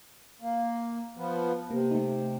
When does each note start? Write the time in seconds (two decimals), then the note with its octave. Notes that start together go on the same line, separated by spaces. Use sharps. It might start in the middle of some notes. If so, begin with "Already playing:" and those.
0.42 A#3
1.17 F3 B3
1.71 C3 A#3
1.91 A3 D#4